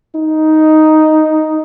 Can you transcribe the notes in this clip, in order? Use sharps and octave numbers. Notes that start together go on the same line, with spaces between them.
D#4